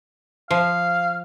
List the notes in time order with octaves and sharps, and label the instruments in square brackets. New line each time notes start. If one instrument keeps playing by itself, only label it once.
[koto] F3 [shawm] F5